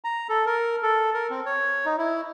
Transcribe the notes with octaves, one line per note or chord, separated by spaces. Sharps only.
A#5
A4
A#4
A4
A#4
C4
C#5
D#4
E4